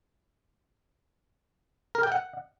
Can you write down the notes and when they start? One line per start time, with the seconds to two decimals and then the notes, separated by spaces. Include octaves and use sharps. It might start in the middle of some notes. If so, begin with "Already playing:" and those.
1.95 A#4
2.03 G5
2.12 F#5